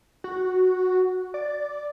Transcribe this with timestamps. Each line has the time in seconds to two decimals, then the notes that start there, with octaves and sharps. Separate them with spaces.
0.24 F#4
1.34 D5